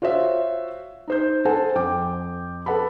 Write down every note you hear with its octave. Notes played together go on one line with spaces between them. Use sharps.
F4 F#4 C5 C#5 E5
D#4 C5 G6
A4 C5 F#5 G#5 A5
F2 G5 D6
A4 B4 F#5 A5 B5